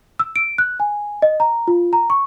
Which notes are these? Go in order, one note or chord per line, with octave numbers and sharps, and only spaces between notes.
E6
D7
F#6
G#5
D#5
A#5
F4
A#5
C#6